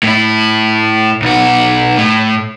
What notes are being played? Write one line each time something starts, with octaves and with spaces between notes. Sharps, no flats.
A2 E4
B1 F#4
A2